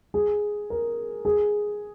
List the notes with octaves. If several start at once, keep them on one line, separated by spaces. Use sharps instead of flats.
G#4
A#4
G#4